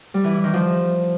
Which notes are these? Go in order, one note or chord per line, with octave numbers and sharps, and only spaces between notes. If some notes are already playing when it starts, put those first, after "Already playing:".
G3
E3
E4
D#3
F3